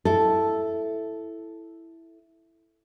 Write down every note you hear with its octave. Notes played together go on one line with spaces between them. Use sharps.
E4 A4